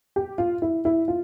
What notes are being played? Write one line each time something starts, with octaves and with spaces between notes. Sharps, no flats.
G4
F4
E4
E4
F4